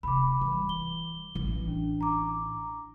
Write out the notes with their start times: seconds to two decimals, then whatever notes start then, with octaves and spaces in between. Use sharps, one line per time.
0.03 D1 C3 B5 D6
0.41 E3 G3
0.69 G7
1.35 A1 E3
1.68 D4
2.01 A#5 D6